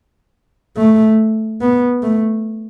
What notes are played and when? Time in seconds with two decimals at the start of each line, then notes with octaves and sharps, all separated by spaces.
0.77 A3
1.61 B3
2.03 A3